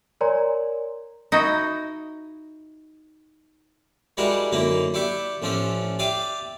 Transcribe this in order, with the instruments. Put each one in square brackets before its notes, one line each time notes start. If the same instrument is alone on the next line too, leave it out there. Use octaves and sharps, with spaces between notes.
[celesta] A#4 C#5 D5 G#5 A#5 C6
[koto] D#4 E4 F#4 D#5
[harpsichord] G3 G#3 D4 E4 F#4 A#4
F#2 D3 A#3 D#4 E4
D4 E4 G4 E5 C#6
A1 F3 C#4 D4 E5
G4 D5 E5 F5 D#6